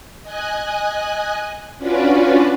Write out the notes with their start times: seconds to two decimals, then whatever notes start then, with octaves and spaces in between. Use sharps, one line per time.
0.23 D#5 G#5 F#6
1.78 C#4 D4 F4 F#4 B4 D5